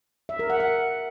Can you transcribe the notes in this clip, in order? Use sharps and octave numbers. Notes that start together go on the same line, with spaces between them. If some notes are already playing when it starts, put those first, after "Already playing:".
E5
A#4
F#5
F#5